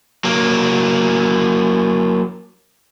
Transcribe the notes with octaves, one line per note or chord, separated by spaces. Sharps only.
F#3 A#3